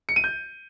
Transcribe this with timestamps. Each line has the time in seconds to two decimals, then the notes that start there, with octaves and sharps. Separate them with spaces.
0.09 C#7
0.16 D#7
0.24 G6